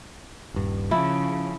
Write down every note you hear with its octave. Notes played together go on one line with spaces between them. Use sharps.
D#1 G2
C#3 F3 E4